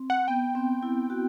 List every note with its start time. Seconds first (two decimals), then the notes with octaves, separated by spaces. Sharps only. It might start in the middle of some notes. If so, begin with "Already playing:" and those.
Already playing: C4
0.10 F#5
0.28 B3 G5
0.55 C4
0.83 E4
1.10 F#4